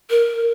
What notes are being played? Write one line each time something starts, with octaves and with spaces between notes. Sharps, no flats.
A#4